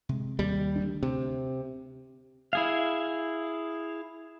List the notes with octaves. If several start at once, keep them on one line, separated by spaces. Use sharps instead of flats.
C3 G#3
D#2 G3
D2 A3 D4
C3
E4 G#4 F5